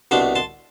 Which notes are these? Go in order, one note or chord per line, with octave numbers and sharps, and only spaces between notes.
C2 B2 A3 D4 A5 C6
A5 C6